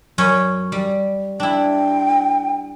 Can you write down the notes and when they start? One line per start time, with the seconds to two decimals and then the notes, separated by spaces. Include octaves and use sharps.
0.18 F#2 C#4 C#5
0.72 G3
1.40 D4 E4 G5